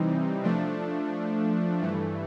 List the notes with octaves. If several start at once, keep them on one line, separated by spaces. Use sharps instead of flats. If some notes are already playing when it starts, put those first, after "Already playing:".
Already playing: C3 E3 G3 C4 D#4
F3 A3 D4
G2 E3 A3